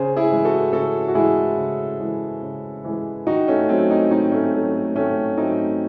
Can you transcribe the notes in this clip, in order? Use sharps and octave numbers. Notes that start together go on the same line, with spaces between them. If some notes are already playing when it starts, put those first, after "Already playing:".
Already playing: C#3 G#4 C5
E4 G#4
E3 G#3
F#4 A4
C#3 F#4 A4
F#4
E3 G#3 E4 G#4
C#3
E3 G#3
C#3
E3 G#3
D#3 D#4 F#4
A3 C#4
F#3 A3 C4
C4 D#4
D#3 C4 D#4
A3 C#4
F#3 A3
A3
D#3 A3 C#4
F#3 A3 C4 D#4